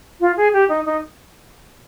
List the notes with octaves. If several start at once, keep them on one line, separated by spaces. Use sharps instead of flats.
F4
G#4
G4
D#4
D#4